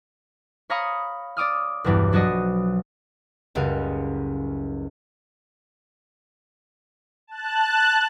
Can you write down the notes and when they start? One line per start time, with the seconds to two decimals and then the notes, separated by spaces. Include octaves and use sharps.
0.70 C#5 F5 A#5 B5 C#6 D#6
1.37 D5 D6 D#6 F6
1.84 B1 E2 G2 E3 B3 D6
2.12 F3 F#3 D4 F#4 D5 D#5
3.55 F#1 C#2 G3 F#4 F5 F#5
7.27 A5 F#6